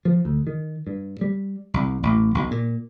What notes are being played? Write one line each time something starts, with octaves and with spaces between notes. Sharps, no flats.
F3
D2
D#3
G2
G3
C2
A1
B1
A#2